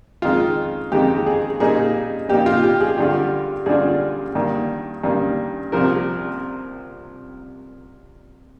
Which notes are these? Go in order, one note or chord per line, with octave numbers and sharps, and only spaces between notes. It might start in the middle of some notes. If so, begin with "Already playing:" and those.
F2 D#3 G#3 F4
F2 D#3 G#3 G4
G#4
A#2 G3 A#3 D#4 G#4
A#2 G3 A#3 D#4 G4
F4
G4
G#4
G2 D3 G3 D4 F4 G4
G2 D3 G3 D4 F4 G#4
G2 D#3 A#3
G2 D#3 A#3
C2 C3 F3 A#4